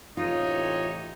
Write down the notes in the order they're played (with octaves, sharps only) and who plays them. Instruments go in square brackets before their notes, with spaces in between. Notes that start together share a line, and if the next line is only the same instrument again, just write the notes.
[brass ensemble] A1 C3 C#5 [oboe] D#4 [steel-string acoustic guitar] F4